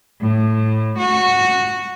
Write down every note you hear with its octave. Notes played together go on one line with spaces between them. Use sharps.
A2
F#4